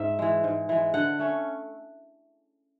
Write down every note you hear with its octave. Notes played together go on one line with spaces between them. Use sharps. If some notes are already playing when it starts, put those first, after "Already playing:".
Already playing: G#2 E5
E3 G#3
G#2
E3 G#3
D3 F#5
A3 C#4